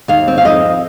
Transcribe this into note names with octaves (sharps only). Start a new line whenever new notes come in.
D#2 F5
C4
F5
F2 D#5